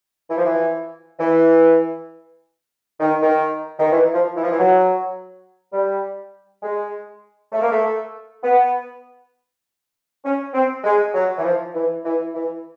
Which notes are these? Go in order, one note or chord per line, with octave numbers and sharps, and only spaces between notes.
E3
F3
E3
E3
D#3
D#3
D#3
E3
F3
E3
F3
E3
F#3
G3
G#3
A3
A#3
A3
B3
C#4
C4
G#3
F#3
E3
F3
E3
E3
E3